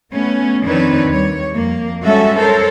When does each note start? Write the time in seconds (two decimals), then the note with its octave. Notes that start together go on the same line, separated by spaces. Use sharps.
0.12 A3 B3 C#4
0.64 F2 D#3 C4 D4 B4 C#5
1.09 D#2 G3 C#5
1.54 F2 A#3
2.03 G3 G#3 C#4 F#4 A4 E5
2.37 A4 A#4 C5 C#5